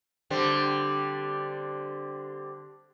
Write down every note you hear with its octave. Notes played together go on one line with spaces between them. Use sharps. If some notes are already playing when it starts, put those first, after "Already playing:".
D3 G3 C4